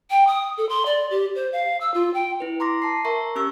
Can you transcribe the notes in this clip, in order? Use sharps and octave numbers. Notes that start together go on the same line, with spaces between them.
G5
D#6
A4
C6
D5
G4
C5
F5
E6
F4
G5
E4 B4
A#5 C6 D6 A#6
A5 C7
A#4 E5 A#5 C#6
C#4 G4 C#6 E6